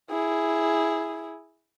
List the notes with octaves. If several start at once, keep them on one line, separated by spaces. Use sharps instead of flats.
E4 G#4